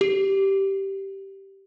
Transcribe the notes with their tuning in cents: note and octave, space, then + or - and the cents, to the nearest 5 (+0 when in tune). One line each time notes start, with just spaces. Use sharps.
G4 -10